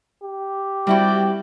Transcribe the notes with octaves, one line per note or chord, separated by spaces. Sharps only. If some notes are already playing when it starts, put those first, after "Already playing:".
G4
G3 C4 E4 F#4 D5 G5